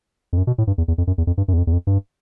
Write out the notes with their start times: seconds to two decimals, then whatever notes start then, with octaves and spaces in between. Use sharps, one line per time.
0.33 F2
0.38 F#2
0.47 B2
0.58 A2
0.67 G2
0.78 E2
0.88 E2
0.98 F2
1.07 F#2
1.18 E2
1.27 F2
1.38 G2
1.48 F#2
1.53 E2
1.58 F2
1.67 E2
1.73 F2
1.87 G2